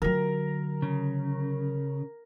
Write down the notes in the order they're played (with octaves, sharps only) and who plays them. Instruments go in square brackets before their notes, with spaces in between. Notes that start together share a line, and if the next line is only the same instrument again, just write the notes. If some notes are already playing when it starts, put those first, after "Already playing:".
[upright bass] D3 F#3 [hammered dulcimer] A#4
[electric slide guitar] C#3